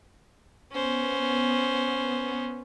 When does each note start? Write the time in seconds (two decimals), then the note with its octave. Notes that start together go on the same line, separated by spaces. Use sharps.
0.72 B3 C#4 C5